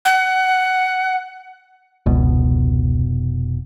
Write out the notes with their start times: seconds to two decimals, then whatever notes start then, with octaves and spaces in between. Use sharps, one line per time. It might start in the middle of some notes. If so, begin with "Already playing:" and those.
0.05 F#5
2.06 F1 C#2 B2